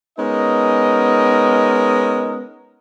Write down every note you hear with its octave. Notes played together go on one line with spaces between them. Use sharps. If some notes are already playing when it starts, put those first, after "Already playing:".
G#3 B3 C#4 D#4 A#4 D#5